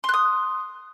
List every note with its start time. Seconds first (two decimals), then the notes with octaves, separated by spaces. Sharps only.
0.04 C6
0.09 F#6
0.14 D#6